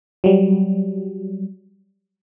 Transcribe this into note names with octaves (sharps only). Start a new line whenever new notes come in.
F#3 G3